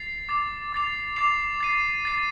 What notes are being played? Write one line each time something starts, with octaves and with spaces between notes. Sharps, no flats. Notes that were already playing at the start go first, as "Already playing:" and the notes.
Already playing: A6 C7 F7
D6 A6 C7 F7
D6 A6 C7 F7
D6 A6 C7 F7
A6 C7 D#7
A6 C7 D#7